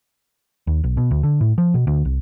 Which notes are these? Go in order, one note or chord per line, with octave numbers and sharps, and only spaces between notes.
D#2
B1
B2
D2
D3
A2
F3
B2
D2
C2